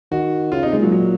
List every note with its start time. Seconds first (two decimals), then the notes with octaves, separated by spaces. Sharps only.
0.12 D#3 F#4
0.52 C#3 F4
0.63 C3 D#4
0.72 G#3
0.79 A#2 F#3
0.92 F#3